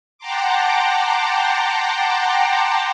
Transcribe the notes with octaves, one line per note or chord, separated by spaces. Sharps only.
F#5 G5 A5 A#5 C6 D6